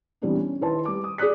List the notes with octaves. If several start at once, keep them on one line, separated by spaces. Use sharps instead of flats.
E3 G3 B3 C4 D4 E4
C#4
D#3 E4 B4 A5 C6
G3 D6
D#6
G#4 D5 D#6 F#6 B6